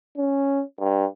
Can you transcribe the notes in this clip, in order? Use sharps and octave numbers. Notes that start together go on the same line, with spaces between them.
C#4
G2